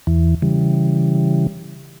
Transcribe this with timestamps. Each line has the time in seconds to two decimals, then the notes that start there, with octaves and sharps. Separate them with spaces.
0.07 E2 E3
0.42 C#3 E3 G3